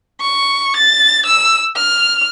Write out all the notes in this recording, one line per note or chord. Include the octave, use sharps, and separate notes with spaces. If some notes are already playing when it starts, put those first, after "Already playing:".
C#6
A6
E6
F6